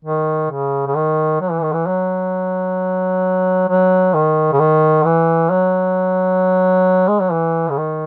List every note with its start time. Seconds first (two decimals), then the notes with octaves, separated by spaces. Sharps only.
0.05 D#3
0.51 C#3
0.87 C#3
0.96 D#3
1.41 F#3
1.51 E3
1.62 D#3
1.73 E3
1.87 F#3
3.69 F#3
4.14 D#3
4.52 C#3
4.59 D#3
5.05 E3
5.50 F#3
7.08 G#3
7.20 F#3
7.32 E3
7.70 C#3
7.78 D#3